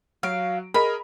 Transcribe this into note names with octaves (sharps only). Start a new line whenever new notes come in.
F#3 F#4 F5 D7
G#4 A#4 D#5 B5